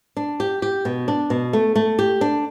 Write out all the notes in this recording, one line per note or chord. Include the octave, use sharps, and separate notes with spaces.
D4
G4
G4
B2
D4
B2
A3
A3
G4
D4